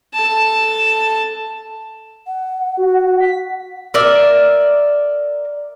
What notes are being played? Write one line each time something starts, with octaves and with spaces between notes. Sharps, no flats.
A4 A5
F#5
F#4
B6
A#4 D5 E5